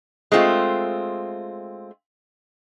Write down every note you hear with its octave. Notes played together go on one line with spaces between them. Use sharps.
G#3 A3 C4 F4